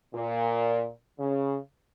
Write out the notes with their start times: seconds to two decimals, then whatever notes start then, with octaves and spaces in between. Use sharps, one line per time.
0.14 A#2
1.19 C#3